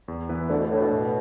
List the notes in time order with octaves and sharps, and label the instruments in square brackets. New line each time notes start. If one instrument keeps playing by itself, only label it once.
[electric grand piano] E2
E3 B3 E4 B4
[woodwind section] D2 D3 [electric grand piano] A3
[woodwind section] B2
[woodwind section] A2 [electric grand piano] D4 A4
[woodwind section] B2
[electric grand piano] A2